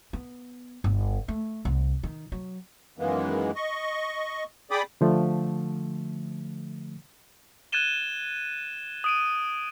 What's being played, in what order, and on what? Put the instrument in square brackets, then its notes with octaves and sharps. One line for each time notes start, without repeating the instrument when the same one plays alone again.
[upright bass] B3
G1
A3
C2
D#3
F#3
[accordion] F#2 D#3 E3 G#3 A#3 B3
D#5 C#6
G#4 D5 G5 B5 D6 D#6
[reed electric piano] D3 F3 A3
[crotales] F#6 G#6 A6 D#7 E7 G7
D#6 D7 D#7